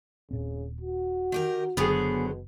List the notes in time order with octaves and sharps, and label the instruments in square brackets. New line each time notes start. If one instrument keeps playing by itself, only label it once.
[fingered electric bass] D#1 A#2 C4 [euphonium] C#3
[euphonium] F#4
[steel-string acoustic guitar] D#3 G4 A#4
[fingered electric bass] F#1 [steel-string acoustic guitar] D3 F#3 C5 [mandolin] B3 G#4
[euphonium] B2